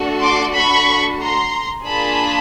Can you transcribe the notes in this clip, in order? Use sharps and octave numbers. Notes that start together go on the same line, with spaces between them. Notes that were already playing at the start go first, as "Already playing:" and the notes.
Already playing: A3 D4 F#4 A4
C6 D6
B5 C#6
A#5 C6
A#3 D4 F4 G#4 A5 B5